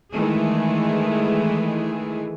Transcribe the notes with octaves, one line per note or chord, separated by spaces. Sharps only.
D#3 E3 G#3 A3 G#4